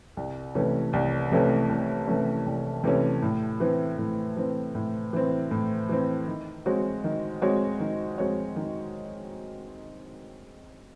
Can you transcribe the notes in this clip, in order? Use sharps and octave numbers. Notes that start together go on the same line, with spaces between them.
C2
C3 E3 A3 C#4
C2
C3 E3 A3 C#4
C2
C3 E3 A3 C#4
C2
C3 E3 A3 C#4
A2
E3 C4
A2
E3 C4
A2
E3 C4
A2
E3 C4
D#3
G#3 C4 F#4 C#5
D#3
G#3 C4 F#4 C#5
D#3
G#3 C4 F#4 C#5
D#3